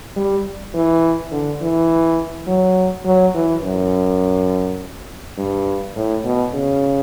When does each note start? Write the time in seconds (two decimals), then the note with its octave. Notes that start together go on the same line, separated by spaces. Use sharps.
0.16 G3
0.74 E3
1.32 D3
1.61 E3
2.47 F#3
3.05 F#3
3.35 E3
3.63 F#2
5.38 G2
5.96 A2
6.24 B2
6.54 C#3